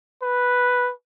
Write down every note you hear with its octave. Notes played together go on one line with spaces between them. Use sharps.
B4